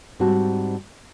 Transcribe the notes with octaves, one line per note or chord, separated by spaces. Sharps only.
G#2 G3 C4 F#4 A5